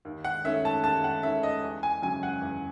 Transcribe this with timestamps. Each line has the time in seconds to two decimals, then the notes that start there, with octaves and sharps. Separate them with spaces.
0.05 D#2
0.25 F#5
0.45 D#3 A3 C#4 E5
0.65 A5
0.84 D#2 A5
1.04 F#5
1.23 D#3 A3 C#4 E5
1.43 D#5
1.64 E2
1.83 G#5
2.02 C#3 F#3 C#4 G#5
2.23 F#5
2.42 E2